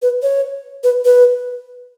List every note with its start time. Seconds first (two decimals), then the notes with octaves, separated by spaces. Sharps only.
0.02 B4
0.23 C#5
0.84 B4
1.05 B4